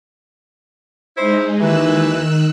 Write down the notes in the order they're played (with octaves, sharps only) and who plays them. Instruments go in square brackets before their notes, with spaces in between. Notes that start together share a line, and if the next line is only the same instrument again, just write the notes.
[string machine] G#3 D#4 [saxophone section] E4 C5
[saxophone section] D#2 E3 [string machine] D#3 E6 F#6